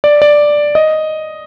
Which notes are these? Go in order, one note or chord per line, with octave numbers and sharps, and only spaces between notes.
D5
D5
D#5